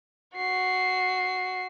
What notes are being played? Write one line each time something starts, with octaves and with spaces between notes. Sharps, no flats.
F#4 C7